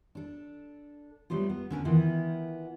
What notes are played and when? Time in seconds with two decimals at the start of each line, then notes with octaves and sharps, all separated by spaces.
0.15 D4 A4
1.30 F#3 G3 A3 B3 F4
1.49 B3
1.70 D3 C#4 A#4 B4
1.85 D#3 E3 B3 E4 F4